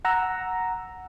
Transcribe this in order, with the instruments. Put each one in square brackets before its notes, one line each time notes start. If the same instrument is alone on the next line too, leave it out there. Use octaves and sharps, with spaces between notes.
[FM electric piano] F#5 A#5 E6